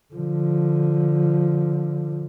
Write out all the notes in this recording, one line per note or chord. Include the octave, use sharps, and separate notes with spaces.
D3 F3